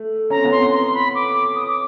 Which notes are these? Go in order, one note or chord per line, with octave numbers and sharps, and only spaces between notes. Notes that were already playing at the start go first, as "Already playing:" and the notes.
Already playing: A3
C#4 A#5
C4
B3 C#4
C6
C6
B5
D6
D#6
D6